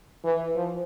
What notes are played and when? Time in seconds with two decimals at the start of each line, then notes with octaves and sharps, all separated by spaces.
0.24 E3
0.55 F3